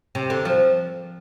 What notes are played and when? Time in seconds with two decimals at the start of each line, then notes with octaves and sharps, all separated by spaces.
0.15 C3
0.30 D3
0.45 F3